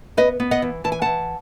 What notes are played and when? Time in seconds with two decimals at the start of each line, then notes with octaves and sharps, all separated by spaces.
0.17 B3 B4 D#5
0.40 B3
0.51 D#5 F#5
0.62 E3
0.84 E3 A5
0.92 G#5
1.02 E3 F#5 A5